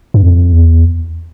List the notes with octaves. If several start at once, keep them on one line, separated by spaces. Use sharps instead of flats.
G2
F2
E2